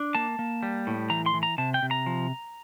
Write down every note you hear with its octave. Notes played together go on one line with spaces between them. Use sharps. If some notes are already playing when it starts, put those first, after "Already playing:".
Already playing: D4
A#3 A5
A#3
G3
A2
E3 A#5
C6
E3
A#5
C3 A5
G5
C3
A#5
F3